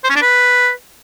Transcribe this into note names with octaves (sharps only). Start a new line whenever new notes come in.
C5
C#4
D4
B4